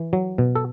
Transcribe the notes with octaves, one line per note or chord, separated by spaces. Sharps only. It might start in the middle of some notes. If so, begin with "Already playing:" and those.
Already playing: E3
F#3
B2
A4